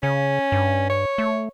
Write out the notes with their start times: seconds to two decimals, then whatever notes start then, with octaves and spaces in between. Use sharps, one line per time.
0.03 C#3 C#4
0.52 G2
0.90 C#5
1.18 A3